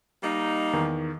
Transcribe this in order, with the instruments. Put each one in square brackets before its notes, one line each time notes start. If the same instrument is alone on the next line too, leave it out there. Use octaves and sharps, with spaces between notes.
[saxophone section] G3 A#3 D#4
[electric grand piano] E2 D#3